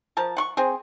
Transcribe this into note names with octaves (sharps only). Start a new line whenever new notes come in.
F3 A#4 A5
F#5 C6 C#6
C4 G#4